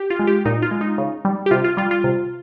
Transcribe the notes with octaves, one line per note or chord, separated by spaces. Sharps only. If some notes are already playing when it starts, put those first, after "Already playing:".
Already playing: G4
F4
G#3
G4
A#2 D#4
F4
G#3
D#4
C#3
G3
G4
C3 F4
F4
G3 F4
F4
C3